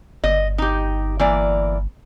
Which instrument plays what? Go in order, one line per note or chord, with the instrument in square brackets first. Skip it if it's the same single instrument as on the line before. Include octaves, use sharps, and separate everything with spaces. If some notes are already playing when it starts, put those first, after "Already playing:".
[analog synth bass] G1 [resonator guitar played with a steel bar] D#5
[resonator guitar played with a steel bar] D#4 G4
E3 A#3 D5